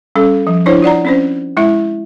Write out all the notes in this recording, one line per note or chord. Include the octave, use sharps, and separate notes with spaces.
G3 C#4 A4
F3
D4 E4 C5 C#5
F4 D5 F#5 A#5
C4 C#4 C5
G#3 E4 E5